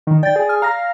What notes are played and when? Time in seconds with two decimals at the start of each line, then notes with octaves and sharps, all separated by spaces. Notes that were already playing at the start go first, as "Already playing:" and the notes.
0.07 D#3
0.23 D5 G5 A6
0.36 G#4
0.49 G#5 F6
0.62 F5 A#5 F6 A#6